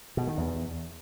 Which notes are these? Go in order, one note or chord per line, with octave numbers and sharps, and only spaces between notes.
B2
D#3
E2